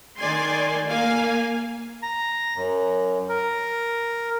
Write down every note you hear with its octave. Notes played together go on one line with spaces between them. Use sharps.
D#3 D5 G#5 C6
A#3 F5 G#5
A#5
F#2
A#4